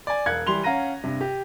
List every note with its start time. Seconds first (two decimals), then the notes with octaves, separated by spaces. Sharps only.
0.07 D5 G#5
0.26 E1 F5 F#6 G#6 C#7
0.47 E3 G3 C6 F7 G7
0.64 C#4 F5 F#5 A#5 A#6 D#7
1.04 G2 C3
1.21 G4